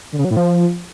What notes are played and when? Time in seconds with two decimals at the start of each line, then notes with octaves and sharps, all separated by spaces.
0.12 D3
0.18 C#3
0.25 F#3
0.31 A2
0.37 F3